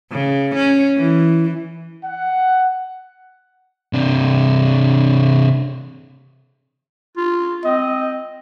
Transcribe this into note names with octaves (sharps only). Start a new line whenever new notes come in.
C#3
C#4
E3
F#5
C3 D4
F4
C4 D#5